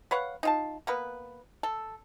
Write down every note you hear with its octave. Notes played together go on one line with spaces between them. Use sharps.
B4 C#5 F5 F#5
D#4 F4 A5
A#3 B3 B4
A4